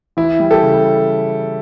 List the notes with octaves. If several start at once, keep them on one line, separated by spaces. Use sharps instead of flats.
E3 E4
G3
G4 A4
C#3